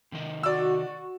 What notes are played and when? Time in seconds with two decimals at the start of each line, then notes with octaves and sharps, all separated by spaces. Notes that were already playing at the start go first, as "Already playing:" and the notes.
0.12 C3 D#3 D#5
0.43 F#4 D5 E6